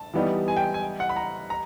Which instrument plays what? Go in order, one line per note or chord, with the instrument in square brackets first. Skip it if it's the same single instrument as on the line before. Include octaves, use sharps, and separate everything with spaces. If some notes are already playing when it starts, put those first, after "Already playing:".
Already playing: [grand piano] A5
[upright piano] E3 G3 B3 D#4 G4
[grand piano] G#5
G5
G#5
F#5
B5
A#5
A#5